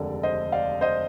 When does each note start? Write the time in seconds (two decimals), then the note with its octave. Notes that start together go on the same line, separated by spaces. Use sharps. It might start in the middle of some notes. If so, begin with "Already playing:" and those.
Already playing: F1 D#2 D3 G#3 A#4 D5
0.23 C5 D#5
0.52 D5 F5
0.81 C5 D#5